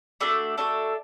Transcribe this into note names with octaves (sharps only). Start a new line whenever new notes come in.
A3 D4 F#4 A4 D5
A3 D4 F#4 A4